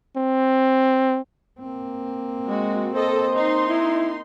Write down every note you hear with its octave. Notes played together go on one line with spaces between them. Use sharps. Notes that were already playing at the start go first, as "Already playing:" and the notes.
C4
A#3 C4
G#3 F#4
A4 C5 D#5
D#4 C6
E4